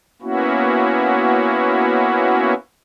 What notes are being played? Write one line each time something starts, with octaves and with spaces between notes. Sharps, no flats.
A#3 B3 C#4 E4 F#4